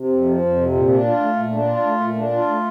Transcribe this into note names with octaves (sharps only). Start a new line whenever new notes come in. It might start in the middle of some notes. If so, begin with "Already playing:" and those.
Already playing: C3
F2
F3
F2
C3
A#2
D4
F4
A3
A#2
D4
F4
A3
A#2
D4
F4
A3